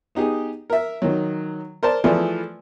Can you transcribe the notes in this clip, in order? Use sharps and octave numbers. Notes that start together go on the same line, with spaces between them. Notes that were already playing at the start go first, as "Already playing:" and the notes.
B3 D#4 G4 G#4
A#4 E5
D#3 F#3
A#4 C5 D5 A5
E3 F3 A3 G#4 B4 D5